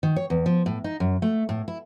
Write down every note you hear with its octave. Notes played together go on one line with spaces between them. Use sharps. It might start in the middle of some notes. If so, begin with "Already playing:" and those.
D#3
C#5
E2
F3
A2
D#4
F#2
A3
A2
E4